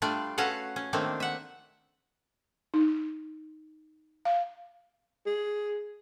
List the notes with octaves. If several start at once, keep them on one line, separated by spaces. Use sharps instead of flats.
G3 A3 D4 F4 D5
C#4 F#4 A4 B4 F5 F#5
C#4
D#3 A3 A#3 C4 D4
E5 F#5
D#4
F5
G#4